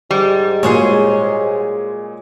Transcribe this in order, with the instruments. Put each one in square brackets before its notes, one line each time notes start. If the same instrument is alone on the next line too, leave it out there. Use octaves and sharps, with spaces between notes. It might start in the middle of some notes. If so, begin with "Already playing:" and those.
[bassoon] G#2 [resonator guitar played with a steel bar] G3
[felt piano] A#2 F#3 G#3 [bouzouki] G#4 C5 C#5